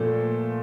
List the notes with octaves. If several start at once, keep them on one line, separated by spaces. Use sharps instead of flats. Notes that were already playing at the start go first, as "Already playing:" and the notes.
Already playing: A#2 F3 A3 A4